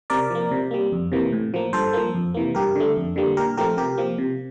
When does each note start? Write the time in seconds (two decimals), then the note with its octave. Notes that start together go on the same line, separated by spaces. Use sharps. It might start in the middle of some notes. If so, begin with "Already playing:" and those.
0.10 C3 A#4 D5
0.30 F3 A#3
0.51 C3
0.71 G3 A#3
0.92 F2
1.12 C3 E3 A#3
1.32 A2
1.54 F3 A#3
1.73 G2 A4 C5
1.93 F3 A#3
2.15 F2
2.34 C3 E3 A#3
2.55 G2 G4 A#4
2.76 D3 A3
2.97 F2
3.16 D3 G3 A#3
3.37 A#2 G4 A#4
3.57 F3 A3 C4 G4 A#4
3.77 C3 G4 A#4
3.98 F3 A#3
4.18 C3